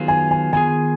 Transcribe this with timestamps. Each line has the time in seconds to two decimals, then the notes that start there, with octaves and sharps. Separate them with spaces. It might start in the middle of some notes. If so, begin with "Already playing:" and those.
Already playing: D#3 F#3 B3 F4 G#4
0.08 G#5
0.31 G#5
0.53 D#3 F#3 B3 F4 G#4 G#5